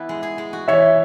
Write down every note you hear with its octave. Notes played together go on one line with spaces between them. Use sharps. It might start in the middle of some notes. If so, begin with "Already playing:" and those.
Already playing: E3 B3 E4
G#3
G#4
G#3
F#4
E3 C#5 E5